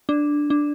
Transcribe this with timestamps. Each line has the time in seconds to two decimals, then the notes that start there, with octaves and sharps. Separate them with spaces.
0.09 D4
0.50 D4